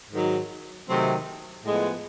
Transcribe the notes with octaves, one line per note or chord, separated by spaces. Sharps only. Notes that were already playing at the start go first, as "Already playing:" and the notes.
G#2 D#3 F#3
C3 D#3 F#3 A3 C4
A2 F3 G#3 B3